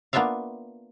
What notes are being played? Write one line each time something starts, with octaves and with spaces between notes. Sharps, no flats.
A#3 B3 D4 F4 E5 F5